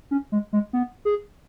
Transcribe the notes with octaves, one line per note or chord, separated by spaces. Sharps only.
C#4
G#3
G#3
B3
G#4